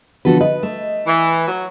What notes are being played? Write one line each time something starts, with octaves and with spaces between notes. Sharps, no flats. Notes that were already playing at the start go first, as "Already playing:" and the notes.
D3 F3 B3 F#4 A4 B4
B4 D#5
A3
E3
F#3